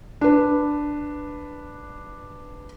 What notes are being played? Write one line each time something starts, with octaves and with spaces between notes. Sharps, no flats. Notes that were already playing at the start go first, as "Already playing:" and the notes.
D4 B4